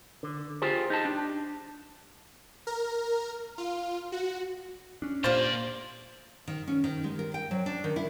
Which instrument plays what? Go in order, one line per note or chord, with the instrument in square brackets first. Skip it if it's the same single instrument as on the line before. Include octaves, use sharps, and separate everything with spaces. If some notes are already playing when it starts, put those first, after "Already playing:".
[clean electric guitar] D3
F4 G4 G#4 C5
D#4 G4 A5
D4
[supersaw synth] A#4
F4
F#4
[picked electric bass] C#4 D4
[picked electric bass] A#2 A#3 [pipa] F4 G4 C5 [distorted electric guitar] D5 F5
[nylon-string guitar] D#3
C#4
D#3
G#3
A#4
G5
F#3
D4
D#3
E4